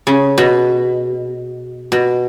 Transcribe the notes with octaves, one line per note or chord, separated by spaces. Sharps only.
C#3
B2
B2